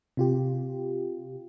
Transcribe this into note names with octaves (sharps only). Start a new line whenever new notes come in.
C3 F4 G4